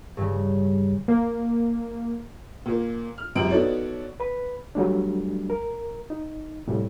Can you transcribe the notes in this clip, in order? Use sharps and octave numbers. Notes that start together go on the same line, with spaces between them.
G2 C#3
A#3
A#2 A#3
F6
C#2 F#2 C3 D7 F#7
B3 D#4 F#4 A4 C#5 D5
B4 B5
F#3 G3 A3 D4
A#4
D#4
A2 C3 G3